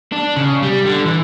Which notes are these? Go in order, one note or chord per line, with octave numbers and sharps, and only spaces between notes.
D4
C#3
G3
D3
E3